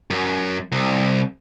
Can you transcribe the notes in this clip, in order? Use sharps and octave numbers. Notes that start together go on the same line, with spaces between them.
F#2
C2